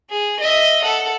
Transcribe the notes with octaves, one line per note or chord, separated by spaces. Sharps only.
G#4
D#5 E5
A4 F#5